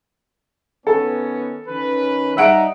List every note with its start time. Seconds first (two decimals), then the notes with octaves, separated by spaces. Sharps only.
0.87 D#3 B3 C#4 A4
1.68 D#3 C#4 B4
2.37 G3 D#4 E5 F#5 D7